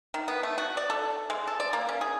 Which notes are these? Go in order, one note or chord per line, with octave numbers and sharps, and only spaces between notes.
D#3
B3
A3
F#4
D5
A4
G#3
A4
D5
A#3
C#4
G#4